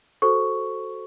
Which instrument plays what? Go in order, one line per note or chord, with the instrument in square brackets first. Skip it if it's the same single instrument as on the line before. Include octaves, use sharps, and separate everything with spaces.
[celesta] F#4 A4 C5 C#6